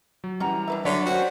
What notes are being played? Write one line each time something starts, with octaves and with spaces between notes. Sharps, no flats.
F#3
E3 G3 C#4 F#4 A#5
D4 B4 E5
D3 F#3 C#5 D5 E5 B6
A#3 C4 C#4 F#4 C5